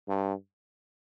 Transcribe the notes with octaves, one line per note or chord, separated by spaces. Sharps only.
G2